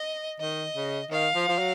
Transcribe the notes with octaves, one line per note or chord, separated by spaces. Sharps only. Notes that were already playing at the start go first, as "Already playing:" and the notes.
Already playing: D#5
D#3 D#5
C#3
D#3 F5
F3
F3
F#3